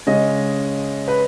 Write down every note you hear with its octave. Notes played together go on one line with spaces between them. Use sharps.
C#3 G#3 C#4 D#5
B4